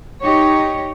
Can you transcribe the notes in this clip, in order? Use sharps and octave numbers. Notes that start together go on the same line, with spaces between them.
D#4 G4 C#5